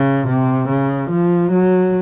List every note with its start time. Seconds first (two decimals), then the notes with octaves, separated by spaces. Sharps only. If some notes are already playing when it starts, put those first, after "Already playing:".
Already playing: C#3
0.28 C3
0.69 C#3
1.10 F3
1.52 F#3